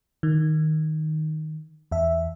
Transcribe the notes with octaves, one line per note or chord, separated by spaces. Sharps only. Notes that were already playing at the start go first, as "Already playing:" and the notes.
D#3
E2 E5